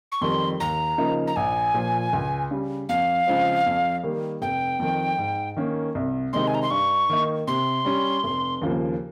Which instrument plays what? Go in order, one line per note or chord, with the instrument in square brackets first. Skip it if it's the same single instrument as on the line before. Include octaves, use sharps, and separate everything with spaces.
[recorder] C#6
[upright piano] F2 D#3 G3 [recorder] C6
[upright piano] D#2 [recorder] A#5
[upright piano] C#3 F3 A#3 D#4
[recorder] A#5
[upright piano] A#1 [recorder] G#5
[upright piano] A#2 F3
C#2
C#3 G3
[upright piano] F2 [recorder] F5
[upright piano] C#3 F3 G#3 C4
F2
D#3 G3 A#3
[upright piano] F1 [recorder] G5
[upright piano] F2 D#3
G#2
D#3 A#3 C#4
C2
[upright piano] C3 D#3 G#3 D#4 [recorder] C6
[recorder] G#5
A#5
C6
[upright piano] G2 [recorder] C#6
[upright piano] D#3 A#3 D#4
[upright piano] C3 [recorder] C6
[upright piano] G3 C#4
F1
D#2 C#3 F3 A#3